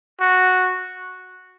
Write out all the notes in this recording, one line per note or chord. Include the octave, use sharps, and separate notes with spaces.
F#4